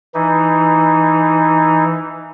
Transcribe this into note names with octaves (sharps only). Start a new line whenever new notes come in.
E3 D#4